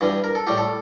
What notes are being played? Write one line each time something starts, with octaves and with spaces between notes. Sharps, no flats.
G2 E3 G3
A#4
A4
A2 G3 G4
A4